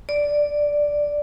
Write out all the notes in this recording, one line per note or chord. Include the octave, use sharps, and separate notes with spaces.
D5